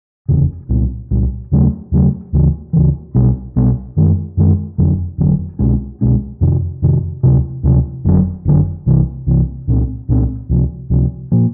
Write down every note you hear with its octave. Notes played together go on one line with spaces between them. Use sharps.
F1 E2 C#3
C2 A#2 G3
C2 A#2 G3
D#2 C#3 F#3 A3
D#2 C#3 F#3 A3
D2 C#3 E3
D2 C#3 E3
B1 B2 G3 B3
B1 B2 G3 B3
F#2 D#3 G#3
F#2 D#3 G#3
F1 F2 D3 F#3
F1 F2 D3 F#3
C2 B2 G#3 C#4
C2 B2 G#3 C#4
F2 C3 D#3
F2 C3 D#3
D2 C3 F3
D2 C3 F3
F#1 F2 D3 F#3
F#1 F2 D3 F#3
C2 C3 E3
C2 C3 E3
C2 A#2 G3 C4
C2 A#2 G3 C4
C#2 C3 F3
C#2 C3 F3
A#2 F3 A#3